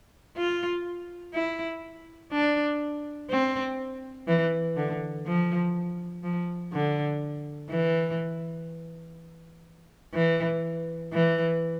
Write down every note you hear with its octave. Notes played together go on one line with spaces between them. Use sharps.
F4
E4
D4
C4
E3
D3
F3
F3
D3
E3
E3
E3